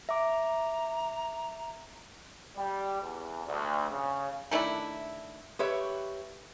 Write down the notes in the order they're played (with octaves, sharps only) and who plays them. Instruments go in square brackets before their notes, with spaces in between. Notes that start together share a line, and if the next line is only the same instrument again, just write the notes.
[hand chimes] E5 D6 [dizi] A#5
[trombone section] G3
E2
D2
C#3
[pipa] D#3 A3 D4 E4
[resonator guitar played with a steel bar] G4 B4 C#5 E5